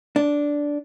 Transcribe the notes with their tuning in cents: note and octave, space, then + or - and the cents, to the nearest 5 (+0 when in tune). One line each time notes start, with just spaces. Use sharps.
D4 -10